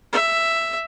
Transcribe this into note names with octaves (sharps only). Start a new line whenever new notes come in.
E5